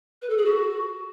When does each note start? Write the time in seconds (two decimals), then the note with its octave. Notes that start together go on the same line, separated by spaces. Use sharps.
0.22 B4
0.29 A4
0.37 G#4
0.45 F#4